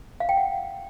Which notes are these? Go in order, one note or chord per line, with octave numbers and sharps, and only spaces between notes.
F5
G5
F#5